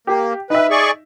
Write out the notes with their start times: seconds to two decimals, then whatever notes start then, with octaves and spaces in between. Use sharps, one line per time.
0.07 A#3 G4
0.50 D#4 B4 E5
0.71 G#4 D5 C#6